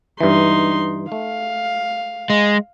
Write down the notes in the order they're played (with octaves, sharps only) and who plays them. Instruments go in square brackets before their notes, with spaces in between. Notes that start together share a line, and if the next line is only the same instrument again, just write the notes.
[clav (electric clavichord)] G2 E3 [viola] D#4 C6
[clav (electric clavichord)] A3 [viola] F5
[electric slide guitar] G#3